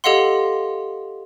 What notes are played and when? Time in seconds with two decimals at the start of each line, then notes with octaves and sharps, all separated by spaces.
0.04 G4 A4 D#5 F5 F#5 C6